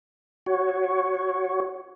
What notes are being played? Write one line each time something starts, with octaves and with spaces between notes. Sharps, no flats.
F#4 C#5